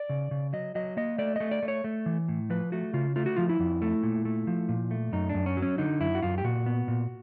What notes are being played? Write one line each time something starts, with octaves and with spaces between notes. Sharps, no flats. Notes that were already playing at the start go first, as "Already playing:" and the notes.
Already playing: D5
C#3
C#3
F#3 D#5
F#3 D#5
A#3 D#5
A3 D5
A3 D#5
D5
A3
C#5
A3
E3
A2
F3 B4
A3 F#4
C#3 F4
A3 F4
F#4
F3 F4
E4
F2
A3
A#2
A3
F3
A#2
A3
F#2 D#4
D4
F#2
C#4
F#3
C#4
D3 D#4
F#2 E4
F#4
F#2 F4
G4
A#2 F#4
B3
A#2